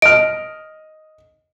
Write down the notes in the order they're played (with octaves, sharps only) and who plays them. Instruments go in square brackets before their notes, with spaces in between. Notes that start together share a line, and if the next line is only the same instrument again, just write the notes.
[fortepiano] D#5 F6 [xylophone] D7